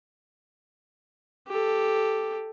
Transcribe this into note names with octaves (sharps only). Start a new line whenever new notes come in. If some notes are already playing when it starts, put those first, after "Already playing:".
G4 A4